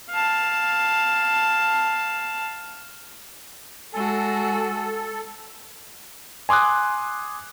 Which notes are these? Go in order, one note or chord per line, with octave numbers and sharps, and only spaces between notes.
F5 A5
G#3 F#4 A4 G#5
G#5 C6 D6 D#6 F#6